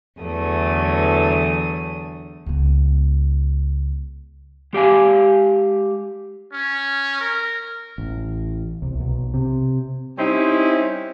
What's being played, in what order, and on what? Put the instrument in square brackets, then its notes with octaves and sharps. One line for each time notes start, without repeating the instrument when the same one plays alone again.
[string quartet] E2 D3 E3 F#3 A3 D#6
[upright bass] C#2 B3
[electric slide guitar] G#3 G4 F5 G#5
[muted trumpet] C#4
A#4
[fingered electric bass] A1
C2
B1
C3
[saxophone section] G3 C4 C#4 D#4 E4